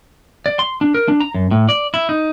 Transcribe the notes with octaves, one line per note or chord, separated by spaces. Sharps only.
D5
C6
D4
A#4
D4
A#5
F#2
A2
D5
E4
D#4